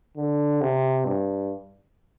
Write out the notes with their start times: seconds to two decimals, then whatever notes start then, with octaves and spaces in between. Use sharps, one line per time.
0.17 D3
0.61 C3
1.05 G2